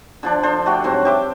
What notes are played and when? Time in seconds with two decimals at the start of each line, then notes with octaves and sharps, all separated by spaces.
0.23 D3 F3 D4
0.43 D4 A4 C5
0.66 A3 F#4 G4
0.84 G#2 F#3 C4
1.05 G4 E5 D6